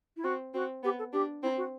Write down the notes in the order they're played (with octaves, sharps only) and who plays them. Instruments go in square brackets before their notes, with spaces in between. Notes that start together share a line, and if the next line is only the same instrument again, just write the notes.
[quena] E4
[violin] C4 [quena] F#4
[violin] C4 [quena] F#4
[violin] B3 [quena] G4
[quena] A4
[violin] D4 [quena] G4
[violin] C4 [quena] E4
[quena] F#4